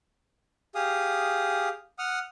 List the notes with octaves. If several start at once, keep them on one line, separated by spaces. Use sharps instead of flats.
G4 G#4 F5 D#6
F#5 D#6 F6